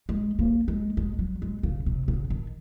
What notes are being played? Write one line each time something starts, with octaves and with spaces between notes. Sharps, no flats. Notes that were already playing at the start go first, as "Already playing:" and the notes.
G#3
A#3
G#3
G#3
F#3
G#3
C#3
C3
C#3
D#3